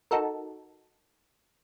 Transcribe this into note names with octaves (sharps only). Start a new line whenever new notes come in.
D#4 F#4 A4 A#4